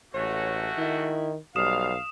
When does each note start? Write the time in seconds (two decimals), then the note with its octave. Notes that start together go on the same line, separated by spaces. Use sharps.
0.14 A1 G#3 A3 F#4 C#5
0.78 D#3 E4
1.56 B1 G3 F5 D#6 E7